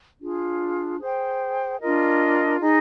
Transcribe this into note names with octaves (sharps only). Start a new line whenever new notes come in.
D4 F4 G#4
G#4 C5 G5
D4 F4 A#4 D#5
D#4 G#4 D#5